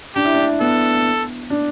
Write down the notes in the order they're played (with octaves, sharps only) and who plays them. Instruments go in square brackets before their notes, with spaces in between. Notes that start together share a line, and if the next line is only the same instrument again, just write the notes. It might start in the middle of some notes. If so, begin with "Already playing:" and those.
[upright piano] D4 [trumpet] G4
[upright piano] E4
D4
[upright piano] B3 [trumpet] A4
[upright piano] D4